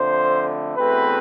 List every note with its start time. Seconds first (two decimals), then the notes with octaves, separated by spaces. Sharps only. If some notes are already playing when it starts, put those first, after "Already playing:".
Already playing: F2 D3 A3 C5
0.76 E2 B2 A3 C4 B4